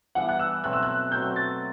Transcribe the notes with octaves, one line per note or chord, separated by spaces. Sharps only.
E3 G3 B3 D4 F#5
F#6
E6
B2 F#3 A3 C4 F#6
E6
F#6
B2 F#3 A3 C4 G6
A6